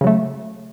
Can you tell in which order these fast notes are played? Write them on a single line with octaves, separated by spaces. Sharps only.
C#3 F#3 A3